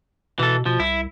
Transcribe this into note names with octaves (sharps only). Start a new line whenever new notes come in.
B2 E3 A4
B2 F3
C2 E4